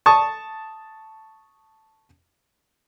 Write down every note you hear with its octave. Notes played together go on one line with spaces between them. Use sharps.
A5 C#6 D#6